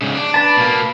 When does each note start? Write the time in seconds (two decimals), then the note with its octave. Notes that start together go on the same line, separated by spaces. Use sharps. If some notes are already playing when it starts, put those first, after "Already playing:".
0.02 G#2 C#3
0.15 D4
0.34 B4 A5
0.57 B2 A#3